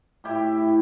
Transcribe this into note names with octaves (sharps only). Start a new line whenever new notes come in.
A2 E4 G4
A2